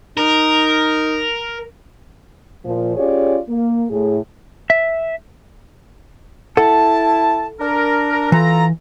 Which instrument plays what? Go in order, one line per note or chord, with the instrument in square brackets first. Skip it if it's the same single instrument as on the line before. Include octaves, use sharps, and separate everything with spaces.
[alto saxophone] D#4 [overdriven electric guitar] A#4
[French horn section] A#2 F3
C#4 F4 G4 G#4 C#5 D5
A#3
A2 G#4
[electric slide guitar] E5
[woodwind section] E4 A5 [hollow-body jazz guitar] A4 F#5
[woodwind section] D4 A#4
[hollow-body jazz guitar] E3 [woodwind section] F4 A4 A#5